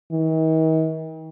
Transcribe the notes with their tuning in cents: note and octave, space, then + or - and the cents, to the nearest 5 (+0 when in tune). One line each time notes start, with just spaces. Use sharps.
D#3 +45